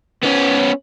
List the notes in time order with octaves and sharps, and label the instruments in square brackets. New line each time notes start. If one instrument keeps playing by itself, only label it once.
[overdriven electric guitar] B3 C#4